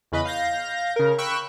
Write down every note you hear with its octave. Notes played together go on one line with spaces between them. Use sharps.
E2 C#3 B4 D#5 B5
F5 G6 A#6
C#3 A#4
G5 B5 C#6 E6 F#6